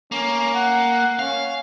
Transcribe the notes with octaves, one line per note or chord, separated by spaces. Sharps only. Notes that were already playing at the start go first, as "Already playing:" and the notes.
A#3 C#4
F#5
C#4 F5